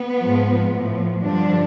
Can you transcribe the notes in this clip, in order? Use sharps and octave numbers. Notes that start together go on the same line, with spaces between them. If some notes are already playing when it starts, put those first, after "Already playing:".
Already playing: B3
G#2 F3
A2 F3
G2 D3 F3 D4